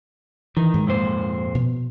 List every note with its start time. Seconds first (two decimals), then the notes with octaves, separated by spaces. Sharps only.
0.57 D#3 E3
0.74 G#2
0.87 F2 A#2 C5
1.55 B2